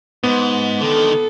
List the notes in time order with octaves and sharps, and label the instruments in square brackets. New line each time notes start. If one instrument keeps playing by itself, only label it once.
[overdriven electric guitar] G#2 [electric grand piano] B3
[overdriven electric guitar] D3 D#3 [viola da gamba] A4